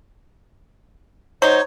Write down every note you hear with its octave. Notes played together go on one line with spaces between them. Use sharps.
F#3 D#4 C5 C#5